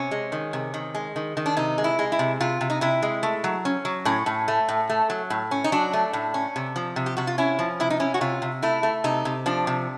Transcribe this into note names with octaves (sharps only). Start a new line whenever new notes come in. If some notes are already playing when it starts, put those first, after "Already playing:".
Already playing: C3 C#4
G#3
D#3
C3
D#3
G#3
D#3
D#3
D4
C3 D#4
G#3
E4
G#3
E4
C3
C3 F4
C3
D#4
C3 E4
G#3
A3
F#3
C#4
F#3
A2 C#4
A2
A3
A2
A3
F#3
A2
C#4
D#4
F#3 D4
A3
A2
C#4
C3
F3
C3
G4
C3 F#4
F4
C#4 E4
F3
C3 E4
D#4
C#4 E4
F#4
C3 F4
C3
A3 E4
A3
C3 D#4
C3
F3 D4
C3